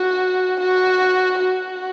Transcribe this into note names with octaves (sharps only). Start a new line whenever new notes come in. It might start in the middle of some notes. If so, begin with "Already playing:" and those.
Already playing: F#4
F#4
F#4